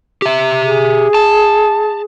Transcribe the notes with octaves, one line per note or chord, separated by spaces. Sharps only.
G4 E5
G#4
A5